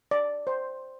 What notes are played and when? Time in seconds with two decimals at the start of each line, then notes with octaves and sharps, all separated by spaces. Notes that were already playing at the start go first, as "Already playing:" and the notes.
0.11 D5
0.47 C5